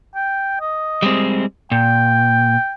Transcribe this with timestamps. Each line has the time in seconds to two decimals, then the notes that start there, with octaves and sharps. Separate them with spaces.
0.15 G5
0.61 D#5
1.02 G3 G#3 C4
1.72 A#2 G5